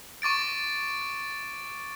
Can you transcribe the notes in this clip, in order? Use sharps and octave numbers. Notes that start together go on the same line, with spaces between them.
C#6 D6 A6 D7